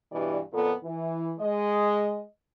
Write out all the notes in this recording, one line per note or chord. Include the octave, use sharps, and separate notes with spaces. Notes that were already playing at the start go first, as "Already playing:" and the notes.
G2 B2 E3 G3 D5
F2 A#2 B3 A4
E3
G#3 D#5